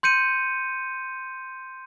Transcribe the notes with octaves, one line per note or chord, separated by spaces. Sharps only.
C6 G6 C#7 D#7